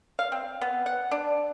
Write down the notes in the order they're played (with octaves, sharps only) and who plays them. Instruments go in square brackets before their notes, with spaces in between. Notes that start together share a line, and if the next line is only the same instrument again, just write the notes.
[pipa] F5
C4
B3
F#5
D4